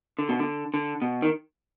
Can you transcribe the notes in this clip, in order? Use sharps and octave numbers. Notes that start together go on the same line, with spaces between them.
D3
B2
D3
D3
B2
D#3